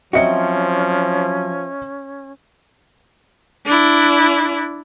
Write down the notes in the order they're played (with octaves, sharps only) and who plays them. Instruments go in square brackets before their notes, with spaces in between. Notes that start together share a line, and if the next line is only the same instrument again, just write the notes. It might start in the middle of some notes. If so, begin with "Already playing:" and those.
[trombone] F3 [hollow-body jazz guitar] F#3 C4 F#4 [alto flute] C#4 [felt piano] D#5 E5 C#7
[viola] D4 E4